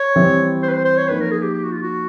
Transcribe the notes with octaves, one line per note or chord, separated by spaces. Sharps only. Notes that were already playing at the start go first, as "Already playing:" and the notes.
Already playing: C#5
E3 G3 C4 E4
C5
B4
C5
C5
C#5
F3 A#3 D#4 B4
A#4
G#4
G4
G4
F#4
F4
F#4